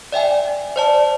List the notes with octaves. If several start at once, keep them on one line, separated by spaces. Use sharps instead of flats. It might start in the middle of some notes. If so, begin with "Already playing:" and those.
D5 E5 G5 G#5
C5 D5 A5